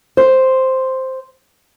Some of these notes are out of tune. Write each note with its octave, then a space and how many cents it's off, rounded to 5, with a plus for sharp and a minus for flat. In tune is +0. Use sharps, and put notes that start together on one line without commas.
C5 +0